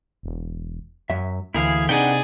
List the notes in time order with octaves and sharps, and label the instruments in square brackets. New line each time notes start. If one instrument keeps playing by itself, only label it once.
[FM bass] E1
[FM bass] F#2 [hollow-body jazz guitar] F#3 E5
[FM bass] D2 [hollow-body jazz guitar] A#2 D3 E3 [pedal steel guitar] E4 G#4 F5
[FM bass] C3 [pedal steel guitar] D4 F#5 G5 [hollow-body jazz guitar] D#4 B4 [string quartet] G#4 D5